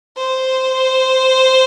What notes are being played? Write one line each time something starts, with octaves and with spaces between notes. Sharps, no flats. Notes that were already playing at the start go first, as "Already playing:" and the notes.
C5